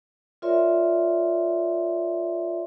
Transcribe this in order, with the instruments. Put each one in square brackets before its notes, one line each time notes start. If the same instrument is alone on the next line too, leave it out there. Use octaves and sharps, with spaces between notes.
[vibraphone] F4 A#4 C#5 D5 E5 C6